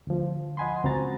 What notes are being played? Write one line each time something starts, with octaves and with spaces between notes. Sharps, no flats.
D2 F3
D#5 F#5 G#5 B5 C6
C#2 C4 F#4 A#5 A6